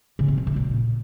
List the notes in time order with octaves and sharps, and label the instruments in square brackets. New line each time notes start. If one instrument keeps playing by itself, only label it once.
[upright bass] C#3
C4
B2
A2
A#2